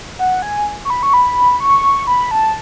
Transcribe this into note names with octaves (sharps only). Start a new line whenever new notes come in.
F#5
G#5
C#6
B5
C#6
B5
C#6
B5
A5